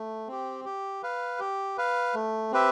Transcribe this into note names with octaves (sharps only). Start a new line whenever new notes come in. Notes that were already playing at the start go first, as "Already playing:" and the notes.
Already playing: A3
C4 G4
G4
B4 F5
G4
B4 F5
A3
C4 G4 B4 E5